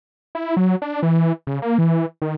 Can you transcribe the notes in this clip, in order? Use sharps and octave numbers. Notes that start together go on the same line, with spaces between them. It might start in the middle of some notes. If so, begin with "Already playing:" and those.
E4
F#3
D4
E3
C#3
A#3
E3
D#3